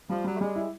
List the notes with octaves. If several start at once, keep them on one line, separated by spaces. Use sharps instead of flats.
F3 G3
F#3 G3
A3
G3 G#3
E4